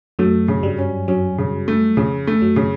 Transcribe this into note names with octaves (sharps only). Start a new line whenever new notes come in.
F#2 F#3 A3
C#3
G2 G3
C#4
F#2 F#3 C#4
C#3
A3
F2 C#3 F3
A3
F#2 F#3
C#3